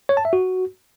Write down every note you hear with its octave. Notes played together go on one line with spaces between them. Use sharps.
C#5
A5
E5
F#4